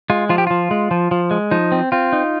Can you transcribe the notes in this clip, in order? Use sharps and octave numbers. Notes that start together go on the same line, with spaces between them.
G#3 F4
F3 F4
G4
F3 F4
G#3
F3
F3
G#3
F3 D#4
C4
C4 F4
D#4